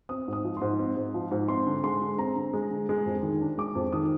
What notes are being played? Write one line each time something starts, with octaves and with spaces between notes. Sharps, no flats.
C4 D#6
G#2 D#6
F3
G#2 C6
C4
G#2
F3
G#2
C4 C6
D3
G#3 C6
D3
C4 A#5
D3
G#3
D3
G#3
F2
D#3
D4
G#3 D6
F2
D#3 D#6